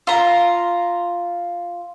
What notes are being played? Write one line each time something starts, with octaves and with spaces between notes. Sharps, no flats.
F4 A#5